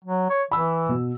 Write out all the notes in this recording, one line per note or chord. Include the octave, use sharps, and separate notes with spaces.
F#3
C#5
E3 B5 E6
B2